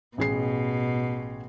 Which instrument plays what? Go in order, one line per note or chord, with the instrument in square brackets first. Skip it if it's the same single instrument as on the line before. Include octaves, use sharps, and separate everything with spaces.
[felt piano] A1 G#4 C7 [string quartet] B2